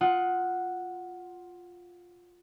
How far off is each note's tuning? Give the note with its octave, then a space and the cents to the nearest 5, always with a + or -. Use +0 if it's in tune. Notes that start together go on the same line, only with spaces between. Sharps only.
F4 +10 F#5 +0 D#6 +25